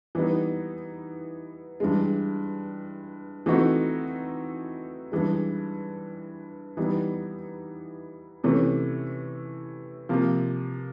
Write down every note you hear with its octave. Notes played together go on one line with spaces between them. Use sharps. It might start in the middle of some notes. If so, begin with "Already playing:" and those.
E3 G3 B3 D#4
G2 E3 G#3
E3 A3 C4 D#4 F#4
G2 E3 G#3
E3 G3 B3 D#4
C3 E3 A3 C#4
C3 F3 A#3